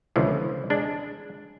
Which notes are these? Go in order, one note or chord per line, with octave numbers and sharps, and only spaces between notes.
C#2 B2 D3 E3 F3
G#3 D4